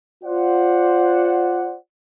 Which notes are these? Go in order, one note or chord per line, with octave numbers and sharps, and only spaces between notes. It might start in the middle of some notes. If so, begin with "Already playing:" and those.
F4 C5 D5 F#5